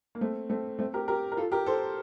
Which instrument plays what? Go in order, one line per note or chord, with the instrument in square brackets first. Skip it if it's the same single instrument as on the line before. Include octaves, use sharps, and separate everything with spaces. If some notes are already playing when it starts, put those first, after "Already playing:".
[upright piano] A#3
A3 C4
A3 C4
A3 C4
G4 A#4
G4 A#4
A#4
F4 A4
G4 A#4
A4 C5